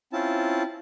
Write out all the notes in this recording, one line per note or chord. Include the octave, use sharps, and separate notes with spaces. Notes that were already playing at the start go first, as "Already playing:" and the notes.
C4 C#4 E4 F4 A5